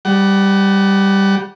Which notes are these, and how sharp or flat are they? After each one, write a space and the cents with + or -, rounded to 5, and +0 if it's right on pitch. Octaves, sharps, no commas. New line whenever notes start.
G3 +0 F#5 +25